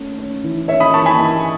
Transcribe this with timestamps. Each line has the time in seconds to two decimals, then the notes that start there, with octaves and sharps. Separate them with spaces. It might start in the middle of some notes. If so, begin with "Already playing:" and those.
Already playing: A3 C#4
0.18 C#4
0.44 E3
0.68 C#4 C#5 E5
0.80 B5 D#6
0.94 E3 A5 C#6
1.06 G#5 B5
1.18 E3